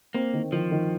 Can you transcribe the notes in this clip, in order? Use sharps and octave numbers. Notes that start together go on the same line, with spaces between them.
A#3 C4
D#3
D#3 F3
D#3